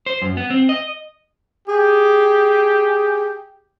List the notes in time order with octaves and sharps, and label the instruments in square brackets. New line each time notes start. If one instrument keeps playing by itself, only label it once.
[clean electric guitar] C5
F#2
B3
C4
D#5
[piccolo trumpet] G4 [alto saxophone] G#4